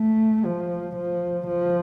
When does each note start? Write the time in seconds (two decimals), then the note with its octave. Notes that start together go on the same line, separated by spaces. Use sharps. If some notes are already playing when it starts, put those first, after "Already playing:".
Already playing: A3
0.45 F3
0.96 F3
1.47 F3